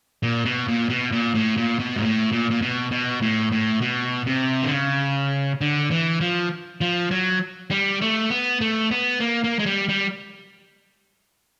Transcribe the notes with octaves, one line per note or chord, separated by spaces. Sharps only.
A#2
B2
A#2
B2
A#2
A2
A#2
B2
G#2
A2
A#2
A#2
B2
B2
A2
A2
B2
C3
D3
C#3
D3
E3
F3
F3
F#3
G3
A3
B3
A3
B3
A#3
A#3
G#3
G3
G3